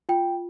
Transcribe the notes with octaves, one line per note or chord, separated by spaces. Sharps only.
F4 G5